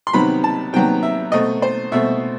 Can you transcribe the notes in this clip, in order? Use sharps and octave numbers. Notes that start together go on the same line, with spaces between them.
C6
C3 D#3 F#3 B3 B5
A5
C3 D#3 F#3 B3 G5
E5
B2 A3 C4 D#5
C5
B2 A3 C4 E5